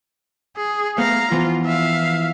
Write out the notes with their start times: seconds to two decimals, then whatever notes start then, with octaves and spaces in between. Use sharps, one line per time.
0.56 G#4
0.98 A3 B3 F5 A#5
1.32 E3 F3 B3 F4
1.65 E5 F5